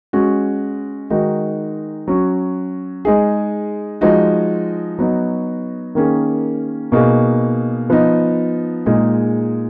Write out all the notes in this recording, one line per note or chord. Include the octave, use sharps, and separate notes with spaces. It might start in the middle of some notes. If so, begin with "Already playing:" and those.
G#3 C#4 F#4
D#3 G#3 D#4 F#4
F#3 C#4 F#4
G#3 D#4 G#4
F3 G#3 D#4 F#4
F#3 B3 D#4 F#4
D#3 A#3 C#4 G#4
B2 A#3 D#4 G#4
F3 B3 D#4
A#2 G#3 D#4 G#4